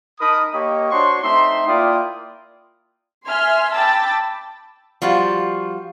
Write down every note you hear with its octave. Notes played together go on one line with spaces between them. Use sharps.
D#4 A#4 A5 B5 D#6
A#3 G4 C#5 D#5
D4 F#4 C5 C#5 C6 C#6
A3 C4 D#4 E5 C6
A#3 E4 F4 D5 G5 D#6
E5 G#5 C6 F6
G5 A5 B5 D6 E6 A6
F3 G3 F4 F#4